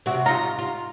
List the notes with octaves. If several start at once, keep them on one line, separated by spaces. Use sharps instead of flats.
C3 F#4
D#4 F4 A#5
F4